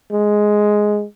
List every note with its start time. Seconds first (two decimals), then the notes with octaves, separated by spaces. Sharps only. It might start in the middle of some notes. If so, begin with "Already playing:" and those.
0.12 G#3